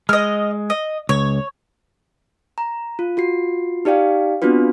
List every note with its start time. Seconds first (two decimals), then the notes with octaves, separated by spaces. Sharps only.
0.09 G#3 D#5 F6
0.70 D#5
1.09 C#2 C#5
2.58 A#5
2.99 F4
3.17 F4 F#4 C7
3.85 D#4 G4 D5 F5 G5
4.42 B3 C4 D4 F4 F#4 B4